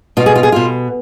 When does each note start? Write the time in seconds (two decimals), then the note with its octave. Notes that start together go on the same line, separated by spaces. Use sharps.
0.17 B2 F4
0.26 G#4
0.35 F4
0.43 G#4
0.52 B2 F4